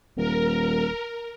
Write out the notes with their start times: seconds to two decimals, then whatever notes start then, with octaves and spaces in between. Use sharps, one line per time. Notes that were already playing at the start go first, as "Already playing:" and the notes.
0.17 D#1 A#4